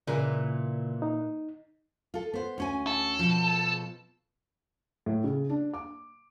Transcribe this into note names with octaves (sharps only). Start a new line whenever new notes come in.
A#2 C#3 E3
D#4
F4 A4
B3 C5
D2 C#4 G#5
A4
B2 F3
A2
C#3
D4
D6